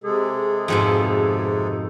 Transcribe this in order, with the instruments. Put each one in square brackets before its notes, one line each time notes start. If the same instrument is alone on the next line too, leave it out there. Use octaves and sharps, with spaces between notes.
[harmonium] C3 G#3 A4 [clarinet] G#4
[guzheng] F2 G#2 B2